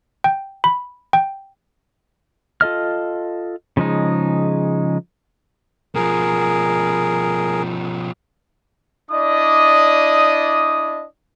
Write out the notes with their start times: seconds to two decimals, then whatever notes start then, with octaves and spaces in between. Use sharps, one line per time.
0.24 G5
0.64 B5
1.13 G5
2.61 F4 A4 D#5 F6
3.77 C#3 F3 G#3 D#4
5.95 B2 F3 G#4 A#4
9.11 D4 E4 D5 D#5 D#6